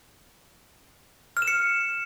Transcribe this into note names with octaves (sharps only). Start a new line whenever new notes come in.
F6
E7
C#7